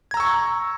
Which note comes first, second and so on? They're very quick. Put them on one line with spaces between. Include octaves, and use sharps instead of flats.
G#6 A#5 E6 C#6